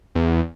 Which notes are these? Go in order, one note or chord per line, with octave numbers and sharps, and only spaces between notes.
E2